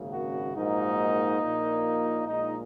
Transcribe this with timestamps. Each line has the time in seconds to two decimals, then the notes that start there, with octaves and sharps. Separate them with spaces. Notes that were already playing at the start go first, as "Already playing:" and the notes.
Already playing: G#1 F#2 C#3 A#3
0.12 F#4
0.55 A#1 G#2 F#3 A#3 D#4
1.40 A#1 A#2 A#3
2.27 A#1 A#2 G#3 D#4